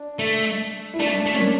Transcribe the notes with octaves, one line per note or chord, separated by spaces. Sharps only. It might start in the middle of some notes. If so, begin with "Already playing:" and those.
Already playing: D4
A3
E4
A3 D4
A3
C#4
A#3